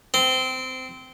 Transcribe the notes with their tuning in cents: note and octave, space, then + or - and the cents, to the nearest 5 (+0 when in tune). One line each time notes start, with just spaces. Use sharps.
C4 -20